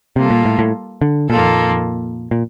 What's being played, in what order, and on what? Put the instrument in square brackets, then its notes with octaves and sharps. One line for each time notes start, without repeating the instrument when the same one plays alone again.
[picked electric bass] C3 [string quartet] G3 A#3 F4 A4
[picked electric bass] A#2
A2
A2
D3
[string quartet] F2 D#3 A#3 F4 A4 [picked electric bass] A#2
[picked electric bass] A#2